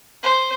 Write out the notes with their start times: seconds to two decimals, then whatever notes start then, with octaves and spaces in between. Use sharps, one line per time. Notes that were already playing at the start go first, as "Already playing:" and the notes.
0.23 C5